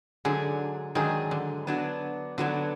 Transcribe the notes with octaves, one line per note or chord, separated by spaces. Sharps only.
G#2 D3 F#3 D4 G#4
G#2 D#3 F#3 D4 G#4
D3
F#3 B3 D4 F#4
D3 F#3 B3 D4 F#4